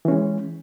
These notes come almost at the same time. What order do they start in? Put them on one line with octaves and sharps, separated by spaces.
E3 C#4 G#3